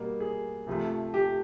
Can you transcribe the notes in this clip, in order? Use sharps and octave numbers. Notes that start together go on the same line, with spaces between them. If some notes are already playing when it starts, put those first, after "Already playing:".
Already playing: B2 G3 A#3
G#4
C3 F3 A3
G4